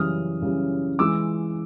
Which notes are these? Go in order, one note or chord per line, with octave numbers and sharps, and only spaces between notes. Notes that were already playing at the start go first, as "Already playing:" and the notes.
Already playing: F#2 C#3 E3 G3 D#6 F6
F#2 C#3 E3 G3
E3 G#3 D6 E6